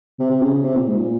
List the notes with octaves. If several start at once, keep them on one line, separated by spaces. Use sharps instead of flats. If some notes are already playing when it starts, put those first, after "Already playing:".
C3
C3
C#3
C#3
C3
A#2
G#2
A#2